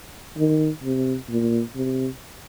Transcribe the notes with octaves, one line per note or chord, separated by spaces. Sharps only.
D#3
C3
A#2
C3